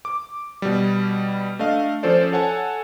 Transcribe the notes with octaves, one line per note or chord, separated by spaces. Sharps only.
D6
B2 G3
A3 D4 D#5 F5
F3 C#4 A4 C5 D5
A4 C#5 F#5 G#5 A5